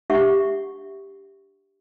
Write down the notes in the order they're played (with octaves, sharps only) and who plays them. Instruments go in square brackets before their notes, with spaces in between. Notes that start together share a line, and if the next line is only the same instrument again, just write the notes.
[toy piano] D4 G4 E5 F#5 C#6